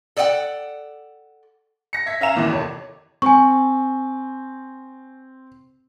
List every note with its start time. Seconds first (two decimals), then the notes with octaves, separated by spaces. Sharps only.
0.17 A4 D5 D#5 F#5 G5
1.93 A#6 C#7
2.06 E5 G#6 B6
2.21 C#4 E5 F5 A#5 E7 F7
2.36 G#1 D#2 A#2 E3
2.49 F2 C3 C#5
3.22 C4 G#5 C#6